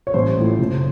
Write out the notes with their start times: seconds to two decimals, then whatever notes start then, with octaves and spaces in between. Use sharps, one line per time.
0.07 C#5
0.14 A1 C5
0.36 A2 F3 A3
0.59 F#1